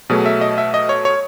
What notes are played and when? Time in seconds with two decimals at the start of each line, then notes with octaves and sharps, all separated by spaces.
0.10 B2 F#3 A3 G#4
0.26 E5
0.41 D#5
0.58 E5
0.74 D#5
0.89 C#5
1.05 C#5